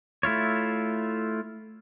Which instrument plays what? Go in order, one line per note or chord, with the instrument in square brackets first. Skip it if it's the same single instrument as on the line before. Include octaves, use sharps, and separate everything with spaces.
[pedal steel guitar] A3 E4 F4 C#5